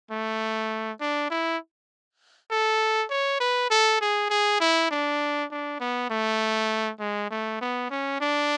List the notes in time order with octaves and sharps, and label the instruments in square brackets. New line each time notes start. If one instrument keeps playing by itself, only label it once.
[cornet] A3
D4
E4
A4
C#5
B4
A4
G#4
G#4
E4
D4
D4
B3
A3
G#3
A3
B3
C#4
D4